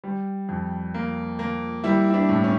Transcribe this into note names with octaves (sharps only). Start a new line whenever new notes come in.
G3
F2
A#3
A#3
G3 E4
E4
D4
A2
C#4